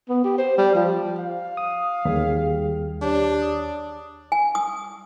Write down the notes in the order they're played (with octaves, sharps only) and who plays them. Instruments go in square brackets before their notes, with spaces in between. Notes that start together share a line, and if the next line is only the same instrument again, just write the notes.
[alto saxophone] B3
G4
C5
G3
F3
[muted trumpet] F5
[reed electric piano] D#6
[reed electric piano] D#2 [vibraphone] G3 G#4
[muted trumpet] D4 [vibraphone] G4 C#5
[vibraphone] D#6
[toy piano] G#5
D#6